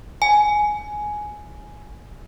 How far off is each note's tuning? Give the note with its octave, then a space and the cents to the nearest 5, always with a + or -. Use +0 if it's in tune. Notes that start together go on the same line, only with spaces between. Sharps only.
G#5 +10